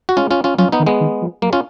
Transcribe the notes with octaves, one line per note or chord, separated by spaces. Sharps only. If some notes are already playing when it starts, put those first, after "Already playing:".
F#4
G#3 C#4 F4
C#4 F4
C#4 F4
F#3 C#4 F4
B3 D#4
D#3
G#3 B3
D#3
F3
F#3 A#3
C#4 F4